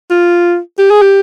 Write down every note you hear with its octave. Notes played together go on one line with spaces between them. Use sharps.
F4
G4
G#4
G4